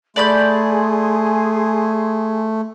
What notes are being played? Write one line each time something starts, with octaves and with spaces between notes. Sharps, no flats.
A3 G#4 D5 B5 C6 G6